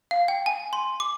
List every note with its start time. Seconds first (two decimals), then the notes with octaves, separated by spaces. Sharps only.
0.11 F5
0.28 G5
0.46 G#5
0.73 C6
1.00 D6